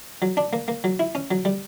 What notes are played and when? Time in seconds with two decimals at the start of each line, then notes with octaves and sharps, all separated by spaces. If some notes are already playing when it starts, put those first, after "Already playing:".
0.22 F#3
0.37 D4
0.53 A#3
0.68 A#3
0.84 F#3
1.00 E4
1.15 C#4
1.31 F#3
1.45 G3